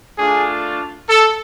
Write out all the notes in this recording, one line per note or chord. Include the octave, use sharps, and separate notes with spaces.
A3 D4 F4 G#4
A4